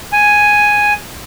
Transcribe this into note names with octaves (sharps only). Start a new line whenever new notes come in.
G#5